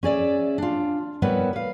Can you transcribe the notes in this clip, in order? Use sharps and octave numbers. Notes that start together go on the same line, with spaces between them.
C#4 G#4 D5 E5
D4 F4
G3 B3 E4 A#4 B4 C#5
B4 F5